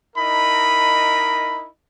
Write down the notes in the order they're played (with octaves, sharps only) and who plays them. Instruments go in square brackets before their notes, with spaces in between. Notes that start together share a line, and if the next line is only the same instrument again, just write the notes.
[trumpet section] D#4 E4 A#4 D#5 B5